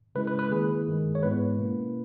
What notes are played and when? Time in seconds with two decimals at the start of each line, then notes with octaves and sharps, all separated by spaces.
0.15 C#3 G#3 C#4 E4 B4
0.27 B4
0.39 B4
0.51 D#3 A#3 E4 G#4
0.87 G2 D#3 G#3
1.15 C#5
1.23 G#2 E3 G#3 B3 E4 B4
1.58 B2 A#3 C#4 E4